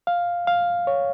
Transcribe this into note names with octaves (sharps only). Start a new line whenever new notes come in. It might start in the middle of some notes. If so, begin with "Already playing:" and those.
F5
F5
C#5